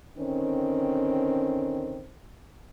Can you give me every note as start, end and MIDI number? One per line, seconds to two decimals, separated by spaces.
0.18 2.06 50
0.18 2.06 51
0.18 2.06 60
0.18 2.06 61